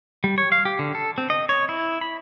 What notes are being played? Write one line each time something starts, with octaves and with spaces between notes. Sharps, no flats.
G3
C#5
F5
G4
D3
A4
C4
D#5
C#5
E4
B5